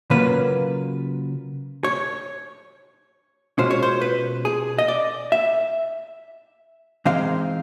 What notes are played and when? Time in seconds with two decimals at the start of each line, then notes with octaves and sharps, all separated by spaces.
0.10 C#3 F#3 A#3 C#4 F4 B4
1.84 C#5
3.58 B2 G#3 C#4 F4 C5
3.71 C#5
3.83 C5
4.01 B4
4.45 G#4
4.79 D#5
4.88 D5
5.32 E5
7.05 E3 G#3 C4 D#4 F5